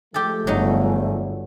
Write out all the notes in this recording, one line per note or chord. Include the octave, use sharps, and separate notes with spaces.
F3 G#3 A3 G4 A4
G1 F#3 D#4